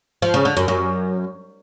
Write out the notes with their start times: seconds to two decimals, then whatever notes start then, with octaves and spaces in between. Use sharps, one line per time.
0.22 F3
0.34 C#3
0.45 D3
0.57 F#2
0.68 F#2